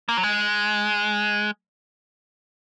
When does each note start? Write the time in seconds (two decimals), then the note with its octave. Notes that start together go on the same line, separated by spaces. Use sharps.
0.09 A#3
0.17 F#3
0.23 G#3